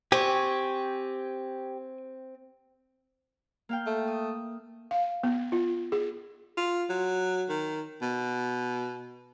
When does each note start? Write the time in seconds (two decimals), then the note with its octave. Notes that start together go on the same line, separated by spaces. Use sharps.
0.12 C4 G4 G#5 C#6
3.69 A#3 F5 G5
3.86 A3
4.08 D#6
4.91 F5
5.24 B3
5.52 F4
5.92 G#4
6.57 F4
6.89 F#3
7.49 D#3
8.02 B2